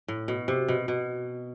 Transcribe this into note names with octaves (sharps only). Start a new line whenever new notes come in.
A2
B2
C3
B2
B2